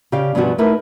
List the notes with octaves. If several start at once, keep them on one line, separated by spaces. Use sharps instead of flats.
C#3 G4 D5 F5 G5
G2 B2 E3 F3 G3 F#4
A3 D#4 E4 A#4 B4